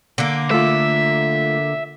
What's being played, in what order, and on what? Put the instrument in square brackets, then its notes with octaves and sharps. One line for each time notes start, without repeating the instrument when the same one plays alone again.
[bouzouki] D3 A#3
[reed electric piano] A3 F4 [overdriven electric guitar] E5